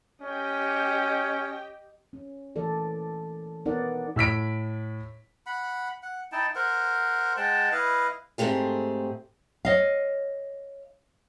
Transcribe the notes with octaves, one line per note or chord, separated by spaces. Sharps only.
C#4 G4 D#5 G5
C#4
E3 A#3 A4 D5
B3 D#4 A#4 D5 F#5
A2 E6 B6 D7
F#5 B5
F#5
D#4 E4 G5 A5
A#4 C5 F#5
G#3 F#5 G5 A5
E4 B4 D#5 F5
G#2 A3 C4 G4 G#4
C#5 D#5 F5